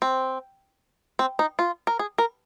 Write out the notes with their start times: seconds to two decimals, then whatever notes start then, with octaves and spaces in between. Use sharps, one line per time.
0.02 C4
1.19 C4
1.39 D#4
1.59 F4
1.87 A#4
1.99 G#4
2.18 A#4